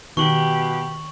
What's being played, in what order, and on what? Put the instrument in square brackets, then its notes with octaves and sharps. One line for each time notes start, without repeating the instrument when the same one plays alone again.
[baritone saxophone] B2 [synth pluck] D#3 [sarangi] G4 [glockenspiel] C#6 F#7 G7